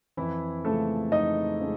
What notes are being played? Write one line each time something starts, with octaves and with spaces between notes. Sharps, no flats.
F2 E3 E4
C#3 F3 G#3 A3 A4
F2 D#4 D#5
C#3 F3 G#3